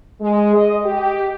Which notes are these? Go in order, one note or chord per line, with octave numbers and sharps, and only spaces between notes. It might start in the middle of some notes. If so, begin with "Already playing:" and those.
G#3
D#5
G4